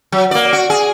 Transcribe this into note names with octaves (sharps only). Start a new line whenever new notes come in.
F#3
A#3 D5
F#4
G#4